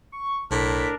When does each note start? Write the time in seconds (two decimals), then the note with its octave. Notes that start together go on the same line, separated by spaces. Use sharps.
0.12 C#6
0.51 B1 A2 D4 A#4 B6